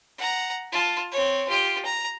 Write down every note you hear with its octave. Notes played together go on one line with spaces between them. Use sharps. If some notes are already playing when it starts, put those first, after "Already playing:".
F#5 A#5
F4 A5
C4 C#5
F4 G4
A#5